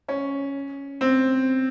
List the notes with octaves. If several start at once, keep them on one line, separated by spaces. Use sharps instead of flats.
C#4
C4